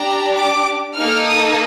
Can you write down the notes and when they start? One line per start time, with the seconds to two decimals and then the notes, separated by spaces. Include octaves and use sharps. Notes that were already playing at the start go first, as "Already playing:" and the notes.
Already playing: D4 G4 A#5
0.36 D6
0.97 A#3 D#4 A4 F6
1.27 D#6